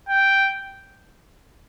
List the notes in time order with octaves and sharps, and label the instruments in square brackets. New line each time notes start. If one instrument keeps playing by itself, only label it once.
[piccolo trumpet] G5